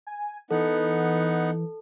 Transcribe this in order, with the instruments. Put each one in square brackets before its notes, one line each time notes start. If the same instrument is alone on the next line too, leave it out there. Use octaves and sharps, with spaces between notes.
[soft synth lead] G#5
[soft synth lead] E3 [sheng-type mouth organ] B3 D#4 F#5 [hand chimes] A4